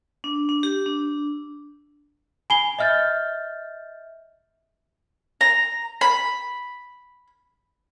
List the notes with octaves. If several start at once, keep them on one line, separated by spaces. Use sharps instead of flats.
D4
D4
G4
D4
G#5 B5 C7 G7
D#5 E5 F6 G6 A6
A#5
B5